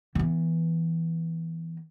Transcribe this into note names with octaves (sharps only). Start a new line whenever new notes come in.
E3 B3